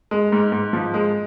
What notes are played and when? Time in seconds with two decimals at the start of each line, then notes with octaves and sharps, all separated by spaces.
0.11 G#3
0.32 G#2
0.52 G#2
0.73 F3
0.94 G#3